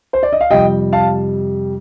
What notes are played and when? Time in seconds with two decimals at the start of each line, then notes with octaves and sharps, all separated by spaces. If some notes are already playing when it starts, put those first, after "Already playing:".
0.13 C5
0.23 D5
0.33 D#5
0.41 F5
0.51 F2 C3 G3 D#5 G5
0.93 F5 A5